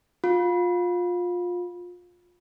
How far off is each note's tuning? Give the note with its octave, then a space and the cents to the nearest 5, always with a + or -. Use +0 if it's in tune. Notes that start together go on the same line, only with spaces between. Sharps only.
F4 +20